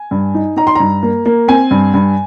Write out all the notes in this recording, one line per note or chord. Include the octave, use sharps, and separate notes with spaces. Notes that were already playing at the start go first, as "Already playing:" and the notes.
Already playing: G#5
G2
D#4
D#4 A#5
C6
G2 A#5
A#3
A#3
C4 G#5
G2
G2